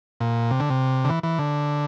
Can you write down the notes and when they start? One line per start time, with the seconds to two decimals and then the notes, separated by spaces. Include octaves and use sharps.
0.21 A#2
0.51 C3
0.60 D3
0.70 C3
1.05 D3
1.09 E3
1.23 E3
1.39 D3